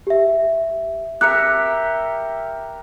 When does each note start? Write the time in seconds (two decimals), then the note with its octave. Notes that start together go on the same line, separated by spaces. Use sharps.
0.07 G4 E5
1.21 G4 A#4 E5 F#6 C#7